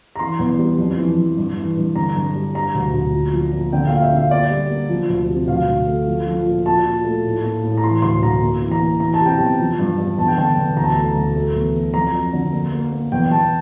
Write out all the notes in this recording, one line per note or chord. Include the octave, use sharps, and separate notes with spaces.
A#5
E3 C6
E2
G3
F2
E3
F2
G2
E3
G2
D3 A#5
G2
G3
G3 A#5
D2
D2
A#2
F3
A#2
D3 G5
A#3 F5
E5
D3 F5
A#3 D5
G3
A#3
F3
D2
C3
D2 F5
D2
A3
F3
F3
A#2
A#2 A5
A#2
A3
A2
A#3
A2
A#5
E3 C6
D2 C6
D2 A#5
A#3
E3
A#5
A#3
E3 A#5
A5
C3 G5
E2 A5
F3
G2
G2
E2 A5
G5
D3 A5
E2
D2 A#5
A5
A#5
A3
D2
A3
E2
A3
F2 A#5
F2
D3
A#3
A#3
A#3
E2 G5
E2 A5